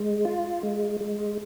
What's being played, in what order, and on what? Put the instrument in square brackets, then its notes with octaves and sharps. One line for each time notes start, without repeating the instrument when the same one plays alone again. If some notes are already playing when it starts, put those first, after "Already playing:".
Already playing: [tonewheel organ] G#3
F4
G#3
G#3